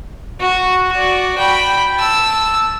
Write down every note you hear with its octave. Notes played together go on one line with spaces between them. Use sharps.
F#4
F#4 D5
G5 B5
A5 E6